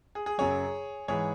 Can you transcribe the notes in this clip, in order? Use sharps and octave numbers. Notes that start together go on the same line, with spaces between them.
G#4
G#4
F#2 C#3 F#3 G#4 C#5
G#2 E3 G#4 C#5